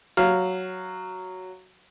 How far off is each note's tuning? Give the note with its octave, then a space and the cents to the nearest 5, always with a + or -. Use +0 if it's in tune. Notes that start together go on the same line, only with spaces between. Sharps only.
F#3 +0 F5 +0